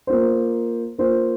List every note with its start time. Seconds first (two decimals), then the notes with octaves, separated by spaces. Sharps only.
0.07 A#3 F4 C5
0.98 A#3 F4 C5